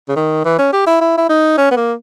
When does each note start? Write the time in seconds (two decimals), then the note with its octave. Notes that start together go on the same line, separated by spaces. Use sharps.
0.09 C#3
0.16 D#3
0.45 E3
0.59 C#4
0.73 G4
0.87 E4
1.01 E4
1.17 E4
1.29 D#4
1.58 C#4
1.71 B3
1.76 A#3